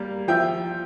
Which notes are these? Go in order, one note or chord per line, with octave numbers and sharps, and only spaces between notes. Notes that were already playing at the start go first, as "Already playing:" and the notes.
Already playing: G3 A#3
F3 E5 G5